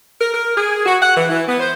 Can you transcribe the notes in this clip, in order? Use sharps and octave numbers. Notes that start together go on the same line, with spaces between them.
A#4
A#4
G#4
F#4
F#5
E3
E3
B3
C5